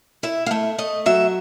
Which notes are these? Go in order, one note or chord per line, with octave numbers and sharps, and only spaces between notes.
E4 E5
F5
A3 E5
A3 D#5
F#3 E5